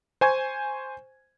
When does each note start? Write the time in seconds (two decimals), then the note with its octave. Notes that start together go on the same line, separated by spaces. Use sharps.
0.21 C5 G#5 C#6 G#6